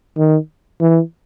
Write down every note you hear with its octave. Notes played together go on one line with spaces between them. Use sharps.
D#3
E3